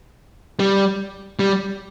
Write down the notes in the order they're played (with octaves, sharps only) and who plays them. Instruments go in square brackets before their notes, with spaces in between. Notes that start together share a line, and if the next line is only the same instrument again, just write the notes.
[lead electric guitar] G3
G3